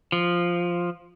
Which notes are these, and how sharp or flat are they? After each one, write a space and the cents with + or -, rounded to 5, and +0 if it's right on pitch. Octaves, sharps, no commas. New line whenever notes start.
F3 +0